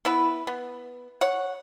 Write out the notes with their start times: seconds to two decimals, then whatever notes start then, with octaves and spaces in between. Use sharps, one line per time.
0.05 B3 E4 B4
0.47 B3
1.21 C#5 F#5